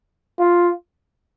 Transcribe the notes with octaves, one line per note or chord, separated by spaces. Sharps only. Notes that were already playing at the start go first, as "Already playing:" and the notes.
F4